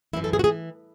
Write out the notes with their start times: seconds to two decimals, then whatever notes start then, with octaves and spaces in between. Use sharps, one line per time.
0.13 F#2 E3 E4
0.24 A4
0.33 G#4
0.39 F#4
0.44 E3 G#4